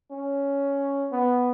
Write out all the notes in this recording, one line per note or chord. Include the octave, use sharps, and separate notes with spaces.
C#4
B3